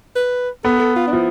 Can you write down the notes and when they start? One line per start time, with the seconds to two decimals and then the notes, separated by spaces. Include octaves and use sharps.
0.16 B4
0.64 B3 A4
0.80 A4
0.96 F4
1.08 D4
1.12 F3 E4